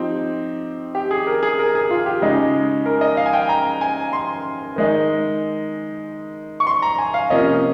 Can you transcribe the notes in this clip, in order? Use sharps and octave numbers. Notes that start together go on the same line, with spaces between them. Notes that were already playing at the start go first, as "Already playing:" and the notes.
Already playing: F3 C4 D#4 G4
G4
G#4
A#4
G#4
A#4
G#4
F4
G4
C#3 G#3 D#4
A#4
D#5
F5
G#5
G5
A#5
G#5
C6
D#3 G#3 D#4
C#6
C6
A#5
G#5
F5
C3 F3 A#3 C#4 D#5